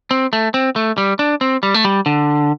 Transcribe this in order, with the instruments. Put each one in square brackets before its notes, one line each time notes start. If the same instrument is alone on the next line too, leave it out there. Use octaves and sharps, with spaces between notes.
[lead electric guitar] C4
A3
C4
A3
G3
D4
C4
G3
A3
G3
D3